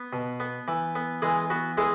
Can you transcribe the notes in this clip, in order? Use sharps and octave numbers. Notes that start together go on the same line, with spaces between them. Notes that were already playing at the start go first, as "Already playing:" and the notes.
Already playing: B3
B2
B3
E3
B3
E3 G#3 G#4
B3 F#4
E3 G#3 G#4